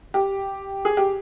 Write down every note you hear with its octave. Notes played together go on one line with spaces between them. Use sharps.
G4
G#4
G4